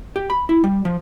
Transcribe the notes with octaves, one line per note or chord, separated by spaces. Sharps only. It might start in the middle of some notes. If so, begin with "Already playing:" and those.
G4
B5
E4
G3
F3